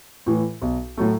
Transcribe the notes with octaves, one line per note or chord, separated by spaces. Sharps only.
A2 E3
B1
A2 F#3 A3